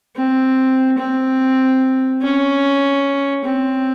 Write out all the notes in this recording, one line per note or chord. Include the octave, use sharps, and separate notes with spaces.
C4
C4
C#4
C4